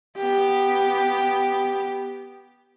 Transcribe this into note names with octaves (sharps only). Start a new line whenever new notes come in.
B3 G4